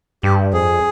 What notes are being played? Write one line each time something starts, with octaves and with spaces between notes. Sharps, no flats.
G2 G4
F2 G#4